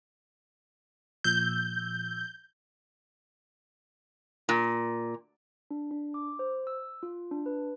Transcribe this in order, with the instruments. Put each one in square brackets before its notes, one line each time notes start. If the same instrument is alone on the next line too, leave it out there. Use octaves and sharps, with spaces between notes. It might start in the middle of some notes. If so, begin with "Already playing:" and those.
[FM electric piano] A#2 F3 E6 [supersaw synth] G6
[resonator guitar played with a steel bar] A#2
[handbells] D4
D4
D6
C5
E6
F4
D4
B4